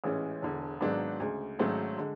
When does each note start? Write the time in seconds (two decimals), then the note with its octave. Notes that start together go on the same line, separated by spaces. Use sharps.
0.04 A1 G#2 E3 G#3 C#4
0.42 E1 E2 D3
0.81 G#1 G#2 F#3 B3 D4
1.20 D2 C#3 G#3
1.59 G#1 G#2 F#3 A3 C#4
1.98 D3 G#3